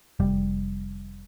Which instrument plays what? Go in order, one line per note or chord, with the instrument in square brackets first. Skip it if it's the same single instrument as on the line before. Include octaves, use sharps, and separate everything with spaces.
[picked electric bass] F1 G3